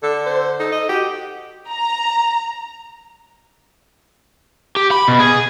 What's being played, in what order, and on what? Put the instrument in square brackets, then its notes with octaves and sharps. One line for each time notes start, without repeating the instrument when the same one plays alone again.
[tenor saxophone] D3 [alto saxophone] A4
[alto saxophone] C5
[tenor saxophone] D#4 [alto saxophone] A4
[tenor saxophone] D#5
[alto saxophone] F#4 [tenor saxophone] G4
[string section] A#5
[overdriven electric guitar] G4
B5
B2
G#4